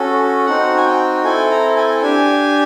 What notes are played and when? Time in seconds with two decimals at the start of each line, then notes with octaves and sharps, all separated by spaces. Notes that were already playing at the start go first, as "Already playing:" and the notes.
Already playing: C#4 F#4 A4
0.46 C4 D#4 F#4 F#5
0.77 G#5
0.86 G5
1.24 C4 E4 A4 G#5
1.51 A#5
1.76 G#5
2.02 D4 G4 G#5